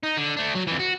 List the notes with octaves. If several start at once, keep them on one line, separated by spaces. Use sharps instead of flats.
D#4
D3
A3 D4
F#3
F2 E3
F#4